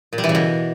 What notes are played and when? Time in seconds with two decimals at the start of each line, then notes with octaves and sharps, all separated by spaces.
0.13 A#2
0.18 G3
0.24 E3
0.29 C#3
0.35 B2